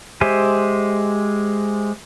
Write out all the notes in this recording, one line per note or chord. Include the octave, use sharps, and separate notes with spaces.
G#3 G4 C5 E5 G#5